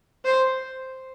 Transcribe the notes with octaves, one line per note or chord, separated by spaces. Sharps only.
C5